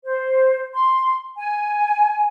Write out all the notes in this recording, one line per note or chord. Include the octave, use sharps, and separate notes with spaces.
C5
C6
G#5